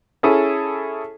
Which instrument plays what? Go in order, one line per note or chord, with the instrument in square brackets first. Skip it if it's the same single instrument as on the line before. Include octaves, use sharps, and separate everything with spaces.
[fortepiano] C#4 E4 G#4 A4